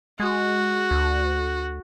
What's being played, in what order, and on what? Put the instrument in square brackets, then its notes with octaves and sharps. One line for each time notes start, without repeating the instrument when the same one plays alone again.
[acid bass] G#3 [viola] F#4
[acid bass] D2